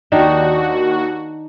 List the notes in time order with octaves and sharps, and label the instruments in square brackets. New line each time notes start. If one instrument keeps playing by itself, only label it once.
[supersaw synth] D#2 F#4 [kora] D#3 D4 D#4